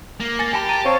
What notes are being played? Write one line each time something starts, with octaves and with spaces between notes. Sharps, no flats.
A#3
G#5 A6 A#6
G4 G#5 A5 B5
A5 A#5 A6
C4 C#5 F5 C#6